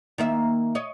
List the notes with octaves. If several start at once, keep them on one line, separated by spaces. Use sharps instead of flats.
D#3 A#3 E5
C#5 D#5